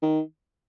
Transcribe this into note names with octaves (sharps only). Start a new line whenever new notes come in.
D#3